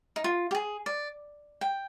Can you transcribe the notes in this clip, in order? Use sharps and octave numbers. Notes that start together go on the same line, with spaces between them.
D#4
F4
G4
G#4
D5
G5